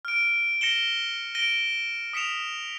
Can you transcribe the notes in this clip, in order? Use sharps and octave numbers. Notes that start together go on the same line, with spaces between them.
F6 D7
A#6 C#7 E7 G7
A#6 D7 D#7 G7
D#6 B6 C#7 E7 F7